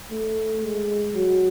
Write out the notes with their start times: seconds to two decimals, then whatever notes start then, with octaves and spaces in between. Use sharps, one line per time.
0.10 A3
0.62 G#3
1.14 F#3